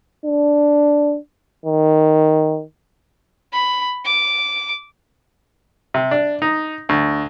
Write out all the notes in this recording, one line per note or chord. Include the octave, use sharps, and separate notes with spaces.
D4
D#3
B5
D6
C3
D4
D#4
D2